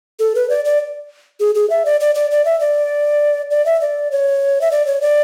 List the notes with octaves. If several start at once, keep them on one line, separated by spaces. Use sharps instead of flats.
A4
B4
D5
D5
G#4
G#4
E5
D5
D5
D5
D5
E5
D5
D5
E5
D5
C#5
E5
D5
C#5
D5